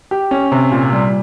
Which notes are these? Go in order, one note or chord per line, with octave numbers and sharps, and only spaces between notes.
G4
C#4
C3
A#2
G3